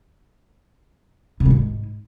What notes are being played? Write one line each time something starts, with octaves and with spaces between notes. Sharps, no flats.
C3
G3
G#2